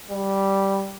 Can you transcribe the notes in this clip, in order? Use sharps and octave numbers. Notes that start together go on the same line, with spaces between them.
G3